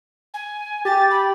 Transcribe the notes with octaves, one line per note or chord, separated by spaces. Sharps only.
G#5
G4 A6
B5